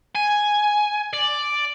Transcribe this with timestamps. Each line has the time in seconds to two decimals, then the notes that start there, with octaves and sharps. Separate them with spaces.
0.15 G#5
1.13 D5